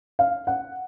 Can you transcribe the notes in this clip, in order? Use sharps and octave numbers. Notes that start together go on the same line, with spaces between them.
F5
F#5